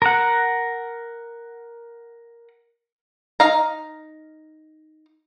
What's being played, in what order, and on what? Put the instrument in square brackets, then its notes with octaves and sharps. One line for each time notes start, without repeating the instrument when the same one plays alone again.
[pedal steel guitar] A#4 F#5
[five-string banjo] D#4 F5 A#5